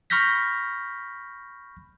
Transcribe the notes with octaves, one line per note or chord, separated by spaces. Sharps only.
B5 C#6 F6 G6 A#6 B6